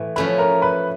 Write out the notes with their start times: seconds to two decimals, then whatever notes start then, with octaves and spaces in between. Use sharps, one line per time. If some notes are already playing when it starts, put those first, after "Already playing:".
Already playing: A2 E3
0.16 F3 A3 C#4 E4 B4 B5
0.38 A#4 A#5
0.62 B4 B5